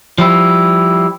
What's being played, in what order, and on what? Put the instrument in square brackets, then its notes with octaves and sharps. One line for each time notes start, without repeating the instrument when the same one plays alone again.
[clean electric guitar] F3 G3 E4